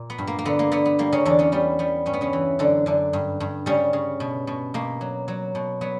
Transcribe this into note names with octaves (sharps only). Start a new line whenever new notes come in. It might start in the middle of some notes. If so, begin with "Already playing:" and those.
Already playing: A#2
B3
G2
A#3
A#3
D3 B3
A#3
D3 B3
B3
G3 A#3
C#3 C#4
E2 D3 D4
C#3 C#4
G3 B3
G3 B3
G2 C#4
B3
C#3 C#4
E3
F#2 D3 D4
F#2 D3 D4
G2
G2
C#3 G3 C#4
C#3
B2
B2
B2 A#3
F#3
F#3
B2
F#3 B3